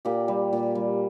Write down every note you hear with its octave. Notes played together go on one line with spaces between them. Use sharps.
A#2 G4
G3
A#2
G3